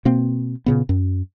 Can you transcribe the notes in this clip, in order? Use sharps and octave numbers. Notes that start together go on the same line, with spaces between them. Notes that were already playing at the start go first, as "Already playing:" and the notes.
B2 A#3 C4
A#2 C#3 B3
F#2